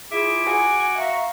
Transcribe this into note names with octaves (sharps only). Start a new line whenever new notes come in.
E4 F4 G#4 E5 D6
F#4 G#5
E5 F5 A#5 C#6